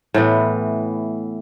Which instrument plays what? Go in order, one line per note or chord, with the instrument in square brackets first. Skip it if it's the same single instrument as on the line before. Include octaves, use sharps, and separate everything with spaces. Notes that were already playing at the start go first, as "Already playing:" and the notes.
[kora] A2 E3 B3